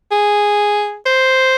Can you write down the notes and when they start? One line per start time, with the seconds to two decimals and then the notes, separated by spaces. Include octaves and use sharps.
0.12 G#4
1.06 C5